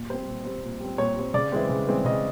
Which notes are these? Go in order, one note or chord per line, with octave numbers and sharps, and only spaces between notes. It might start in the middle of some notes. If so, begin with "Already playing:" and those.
Already playing: A#2
G3 C4 C5
A#2
G3 C4
A#2
G3 C4
A#2 C#5
G3 C4
C#3 D5
E3 G#3 C4
C#3
E3 G#3 C4
C#3 D#5